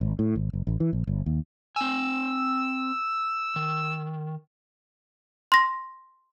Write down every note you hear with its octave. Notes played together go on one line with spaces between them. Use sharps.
G#1
A2
G#1
F#1
A1
E3
A#1
G1
D#2
C4 G#5 E6
D#3
C6 A#6